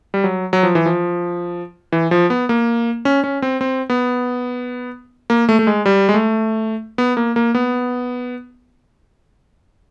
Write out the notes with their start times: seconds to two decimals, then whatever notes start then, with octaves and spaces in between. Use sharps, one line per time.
0.14 G3
0.24 F#3
0.53 F#3
0.63 F3
0.75 E3
0.86 F3
1.92 E3
2.11 F3
2.30 B3
2.49 A#3
3.05 C#4
3.24 C#4
3.42 C4
3.61 C4
3.90 B3
5.30 A#3
5.49 A3
5.59 A3
5.67 G#3
5.86 G3
6.09 G#3
6.14 A3
6.98 B3
7.17 A#3
7.36 A#3
7.55 B3